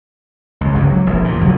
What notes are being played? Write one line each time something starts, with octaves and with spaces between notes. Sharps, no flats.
C#2
G1 C#2 G2 C#3
F#3
F1 A#1 E2
E2 A#2
F#1 F2 F#3 G#3